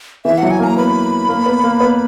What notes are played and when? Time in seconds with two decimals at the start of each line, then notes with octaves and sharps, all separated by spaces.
0.25 E3 E5
0.38 F#3 F#5
0.51 G#5
0.60 A#3 A#5
0.77 B3 B5
1.29 A#3
1.46 B3
1.64 A#3
1.80 B3